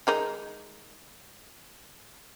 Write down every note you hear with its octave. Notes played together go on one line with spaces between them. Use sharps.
D#3 G#3 D#4